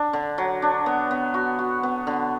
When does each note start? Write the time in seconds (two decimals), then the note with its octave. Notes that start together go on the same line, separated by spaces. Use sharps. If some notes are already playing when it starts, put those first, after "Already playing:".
Already playing: D4
0.13 D3
0.38 F#3
0.62 D4
0.86 B3
1.11 B3
1.34 F#4
1.59 F#4
1.83 B3
2.07 D3